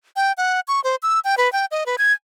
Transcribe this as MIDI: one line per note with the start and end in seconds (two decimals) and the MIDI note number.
0.16 0.32 79
0.38 0.60 78
0.68 0.81 85
0.84 0.96 72
1.03 1.20 88
1.24 1.35 79
1.38 1.51 71
1.52 1.65 79
1.71 1.84 75
1.86 1.96 71
1.98 2.13 92